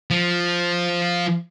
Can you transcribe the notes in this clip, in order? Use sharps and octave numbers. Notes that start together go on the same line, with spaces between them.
F3